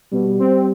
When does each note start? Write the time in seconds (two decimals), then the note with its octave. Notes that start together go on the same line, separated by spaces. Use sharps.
0.12 B2 G3
0.39 C4